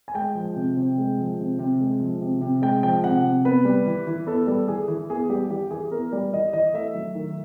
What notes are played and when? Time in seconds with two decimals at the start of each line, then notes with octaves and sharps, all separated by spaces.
0.08 G#5
0.15 G#3 G5
0.35 F3
0.56 C3
0.76 C3
0.98 G#3
1.18 F3
1.39 C3
1.59 C3
1.81 G#3
2.00 F3
2.21 C3
2.41 C3
2.62 G#3 G5
2.83 F3 G5
3.04 C3 F#5
3.23 C3
3.45 B3 B4
3.65 G3
3.86 E3
4.07 E3
4.26 B3 A4
4.47 G3 A4
4.68 E3 G#4
4.88 E3
5.09 B3 G#4
5.30 G3 G4
5.50 E3 G4
5.71 E3 G#4
5.91 B3 A#4
6.12 G3 D5
6.33 E3 D#5
6.53 E3 D#5
6.74 A3 E5
6.94 F#3
7.15 D#3